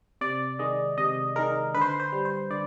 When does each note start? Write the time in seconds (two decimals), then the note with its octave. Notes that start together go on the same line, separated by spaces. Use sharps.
0.21 C3 D5
0.59 D#3 G#3 D#5
0.98 C3 D#5
1.36 D#3 G#3 A#4
1.74 D3 B4
1.81 C5
1.88 B4
2.00 C5
2.12 G3
2.25 C5
2.50 D3 D5